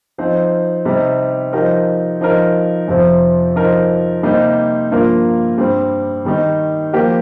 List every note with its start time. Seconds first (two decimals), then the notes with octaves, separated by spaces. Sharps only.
0.18 F3 C4 D#4 C5
0.85 C3 G3 C4 D#4
1.53 F3 D#4 G4 A#4
2.21 F3 D#4 A#4
2.88 F2 C3 F3 C4
3.56 F3 D#4 A#4
4.23 C3 G3 A#3 D#4 C5
4.90 G2 F3 A#3 F4 A#4
5.58 G2 G3 C4
6.25 D#3 G3 D#4
6.93 F3 A#3 G4 A#4